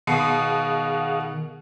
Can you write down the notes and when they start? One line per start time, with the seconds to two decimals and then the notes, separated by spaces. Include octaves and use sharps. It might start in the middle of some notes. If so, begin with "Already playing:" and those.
0.07 B2 D#3 G#4 F5 F#5